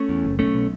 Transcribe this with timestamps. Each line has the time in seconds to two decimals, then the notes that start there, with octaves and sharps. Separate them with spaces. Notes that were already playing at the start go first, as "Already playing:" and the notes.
Already playing: A3 C#4
0.09 E2
0.25 F#1
0.39 B1 A3 C#4
0.54 B2